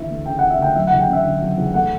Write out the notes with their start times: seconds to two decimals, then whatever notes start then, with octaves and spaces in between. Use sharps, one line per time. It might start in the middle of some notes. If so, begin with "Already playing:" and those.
Already playing: D2 E3 E5
0.10 A3
0.26 C#3 G5
0.39 F#5
0.42 E3
0.50 E5
0.59 D2 G5
0.76 F#3 E5
0.87 F#5
0.92 E2
1.00 G5
1.08 C#4 E5
1.24 D3
1.41 F#3
1.58 E2
1.74 A3 F#5